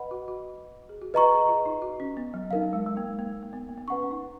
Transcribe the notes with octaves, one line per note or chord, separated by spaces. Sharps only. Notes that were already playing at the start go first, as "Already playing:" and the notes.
Already playing: B4 D#5 F#5 B5
F#4
F#4
G#4
F#4
F4 B4 D#5 A#5 C#6
G#4
F4
D#4
F#4
C#4
B3
F#3
F#3 D#4 A#4 F5
G#3
G#3
A#3
A#3
A#3
B3
A#3
B3
C#4 B4 F#5 C#6
C#4
D#4